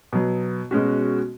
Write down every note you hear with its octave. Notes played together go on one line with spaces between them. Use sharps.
B2 F#3 B3
B2 G#3 C#4 F#4